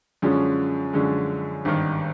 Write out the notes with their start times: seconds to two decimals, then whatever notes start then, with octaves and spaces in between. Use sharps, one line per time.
0.22 F#2 D3 F3 G#3 C#4
0.93 F#2 D3 F3 G#3 C#4
1.65 G#1 G2 D#3